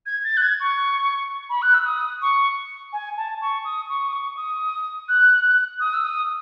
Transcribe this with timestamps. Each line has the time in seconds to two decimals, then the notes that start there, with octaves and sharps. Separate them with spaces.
0.06 G#6
0.24 A6
0.37 F#6
0.42 G#6
0.60 C#6
1.50 B5
1.62 F#6
1.74 E6
1.85 D#6
2.22 C#6
2.93 G#5
3.17 A5
3.41 C#6
3.65 D#6
3.89 C#6
4.08 D#6
4.13 C#6
4.37 D#6
5.09 F#6
5.80 D#6
5.94 E6
6.04 D#6